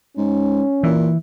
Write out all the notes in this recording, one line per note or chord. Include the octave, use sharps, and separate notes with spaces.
G#2 C#4
A#2 E3